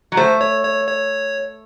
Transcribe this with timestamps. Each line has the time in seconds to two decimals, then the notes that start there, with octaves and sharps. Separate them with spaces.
0.12 F#3
0.17 A3 C5
0.41 C#5
0.64 C#5
0.87 C#5